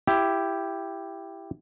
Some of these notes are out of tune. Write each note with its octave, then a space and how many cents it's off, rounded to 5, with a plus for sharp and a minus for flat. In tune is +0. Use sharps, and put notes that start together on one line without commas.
E4 +15 G4 +0